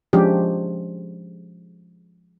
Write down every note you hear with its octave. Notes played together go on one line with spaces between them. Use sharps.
F3 G#3 C#4 D4 G4